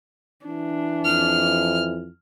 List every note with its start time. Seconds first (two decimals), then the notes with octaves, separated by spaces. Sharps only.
0.46 E3 D4
1.04 F2 F6